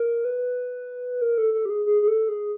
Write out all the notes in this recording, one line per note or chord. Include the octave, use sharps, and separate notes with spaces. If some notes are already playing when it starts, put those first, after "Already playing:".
Already playing: A#4
B4
A#4
A4
A4
G4
G#4
G#4
G#4
A4
G#4